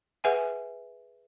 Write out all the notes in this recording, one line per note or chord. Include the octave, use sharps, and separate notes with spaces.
G#4 B4 E5 F#5 G#5